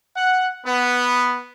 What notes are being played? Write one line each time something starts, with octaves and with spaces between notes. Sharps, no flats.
F#5
B3